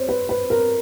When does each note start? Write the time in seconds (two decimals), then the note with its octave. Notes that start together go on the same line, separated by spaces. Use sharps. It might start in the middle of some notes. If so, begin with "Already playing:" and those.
Already playing: C5 C#5
0.09 B4
0.29 B4
0.50 A#4